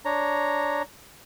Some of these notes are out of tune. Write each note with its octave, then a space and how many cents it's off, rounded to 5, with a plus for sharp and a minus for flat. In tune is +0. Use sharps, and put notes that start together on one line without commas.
D4 +0 C#5 +0 A#5 +0